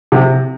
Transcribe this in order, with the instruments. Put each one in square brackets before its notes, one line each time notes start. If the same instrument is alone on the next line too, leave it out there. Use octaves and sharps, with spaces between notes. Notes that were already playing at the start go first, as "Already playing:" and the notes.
[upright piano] C3